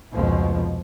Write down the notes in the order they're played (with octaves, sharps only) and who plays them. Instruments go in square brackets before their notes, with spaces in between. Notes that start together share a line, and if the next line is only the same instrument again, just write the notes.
[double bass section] F1 C#2 B2 F3